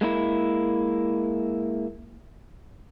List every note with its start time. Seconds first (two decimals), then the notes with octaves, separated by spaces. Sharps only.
0.01 G#3 A#3 D4 E4